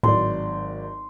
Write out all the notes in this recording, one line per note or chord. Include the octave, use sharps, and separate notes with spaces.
G#1 A2 F#3 D5 C6